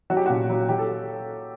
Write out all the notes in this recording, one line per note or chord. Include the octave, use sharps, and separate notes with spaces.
F#3 F#4
G4
A#2 F#4
F#3
F#3 G4
A4